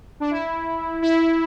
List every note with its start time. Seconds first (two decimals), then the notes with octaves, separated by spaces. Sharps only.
0.20 D4
0.31 E4
1.02 E4